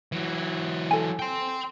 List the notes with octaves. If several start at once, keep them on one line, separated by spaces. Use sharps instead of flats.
E3 F#3
A4 G#5
G5 C6